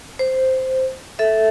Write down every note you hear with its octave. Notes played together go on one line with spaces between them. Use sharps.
C5
A4 E5